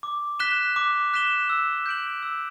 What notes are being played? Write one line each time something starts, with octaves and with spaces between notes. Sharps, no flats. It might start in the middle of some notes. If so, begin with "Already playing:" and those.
D6
F#6 B6 E7 G7
D6
F#6 B6 E7 G7
E6
G6 D7 F#7
E6